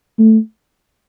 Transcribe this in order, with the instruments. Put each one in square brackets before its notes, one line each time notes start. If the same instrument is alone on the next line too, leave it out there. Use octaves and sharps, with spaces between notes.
[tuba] A3